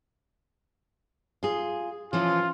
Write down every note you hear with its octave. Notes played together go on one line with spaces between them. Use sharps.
F4 G#4
E3 F3 C#4 F4